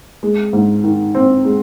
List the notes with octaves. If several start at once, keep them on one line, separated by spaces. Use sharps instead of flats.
G#3
G#2
D#3
C4
G#3